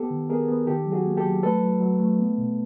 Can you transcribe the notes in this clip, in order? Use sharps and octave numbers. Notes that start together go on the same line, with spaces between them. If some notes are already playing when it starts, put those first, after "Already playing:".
Already playing: B3 G4 A4
D#3
B3 G#4 A#4
B3
D#3 G4 A4
F#3
F#4 G#4
A#3
G4 A4
F#3
A3 A4 B4
F#3
F#3
A3
B3
B2